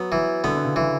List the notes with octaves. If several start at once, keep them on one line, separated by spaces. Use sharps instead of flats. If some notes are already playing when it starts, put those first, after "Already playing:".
Already playing: F#3 B3
E3
D3 B3
D3
C#3
E3